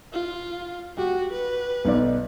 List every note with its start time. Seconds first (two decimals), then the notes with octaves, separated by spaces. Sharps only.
0.13 F4
0.98 F#4 G4
1.33 B4
1.85 B1 D#4 D5